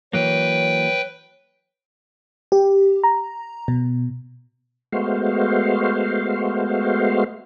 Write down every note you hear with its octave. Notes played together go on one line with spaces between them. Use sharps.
E3 F#3 A#3 B4 C#5 G5
G4
A#5
B2
G#3 A3 B3 F#4 C5 F5